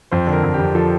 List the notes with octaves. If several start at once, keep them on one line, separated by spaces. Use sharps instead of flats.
F2 C5
D3
A#4
F2
G4
F2
F3 A4